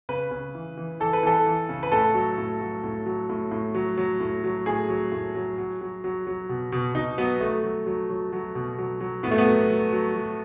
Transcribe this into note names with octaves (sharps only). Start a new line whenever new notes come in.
C#3 B4
C#3
E3
E3
E3 A4
B4
E3 A4
E3
C#3
B4
A2 A4
F#3
A2
F#3
A2
F#3
A2
A2
F#3
F#3
A2
F#3
A2 G#4
F#3
A2
F#3
F#3
F#3
F#3
F#3
B2
B2
B2 D#4
F#3 B3
F#3 A3
F#3
F#3
F#3
F#3
B2
F#3
F#3
A2 B3
A3
B3
F#3
F#3
F#3
F#3